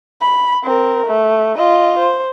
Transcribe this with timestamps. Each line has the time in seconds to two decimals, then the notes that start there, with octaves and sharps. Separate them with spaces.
0.21 B5
0.64 C4 A#4
1.06 A3
1.55 F4 D#5
1.99 C5